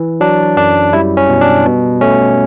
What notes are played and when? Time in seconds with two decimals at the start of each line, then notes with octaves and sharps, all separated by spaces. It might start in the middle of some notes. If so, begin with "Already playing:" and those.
Already playing: E3
0.21 F#3 D4
0.57 F#2 D4
0.93 G3 E4
1.17 C#4
1.29 B2
1.41 D4
1.65 B2
2.01 A3 C#4